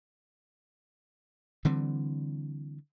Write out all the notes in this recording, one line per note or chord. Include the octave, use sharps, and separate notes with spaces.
D3 E3 G3 C4